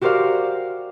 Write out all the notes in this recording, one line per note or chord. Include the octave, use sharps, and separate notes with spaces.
F#4 G4 A#4 C5 D5 F5